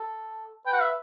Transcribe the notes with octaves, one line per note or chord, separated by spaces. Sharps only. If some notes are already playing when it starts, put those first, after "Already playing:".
Already playing: A4
B4 G5
F#5
E5